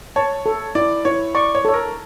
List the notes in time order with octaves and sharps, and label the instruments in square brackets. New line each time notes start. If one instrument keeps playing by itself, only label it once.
[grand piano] C#5 [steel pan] A5
[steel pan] A4
[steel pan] E4 [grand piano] D5
[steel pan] E4 [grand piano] C#5
[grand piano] D5 [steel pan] C#6
[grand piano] C#5
[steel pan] A4 [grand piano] C#5
[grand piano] A#4